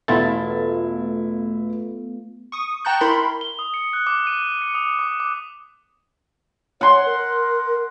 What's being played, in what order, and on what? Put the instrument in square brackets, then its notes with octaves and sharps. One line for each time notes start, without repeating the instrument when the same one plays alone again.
[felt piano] E1 E4 A6 [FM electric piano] A3 B3 F4
[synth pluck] C#6 D#6
G5 A5 A#5 C#6 F#6 G6
E4 A#4 B5 C6
[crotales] G7
D#6
C#7
F#6
D6
D#7
C#7
D#6
D6
D6
[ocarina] C#5 [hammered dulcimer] F#5 C6
[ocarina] A#4